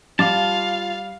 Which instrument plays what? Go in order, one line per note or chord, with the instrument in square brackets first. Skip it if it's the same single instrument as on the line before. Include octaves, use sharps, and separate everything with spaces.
[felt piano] G3 D6 [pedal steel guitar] F4 A5 [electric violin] F5